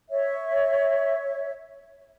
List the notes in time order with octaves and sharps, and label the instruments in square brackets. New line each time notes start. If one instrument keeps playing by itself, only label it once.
[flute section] C#5 E5